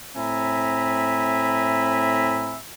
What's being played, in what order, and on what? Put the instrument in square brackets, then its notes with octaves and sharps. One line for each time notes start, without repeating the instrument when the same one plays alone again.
[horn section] A2 C4 E5 G#5 A#5 B5